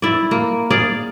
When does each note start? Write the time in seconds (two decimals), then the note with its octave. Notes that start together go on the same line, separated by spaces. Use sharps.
0.02 E4 D5
0.31 A#3
0.70 G#4 D5 F5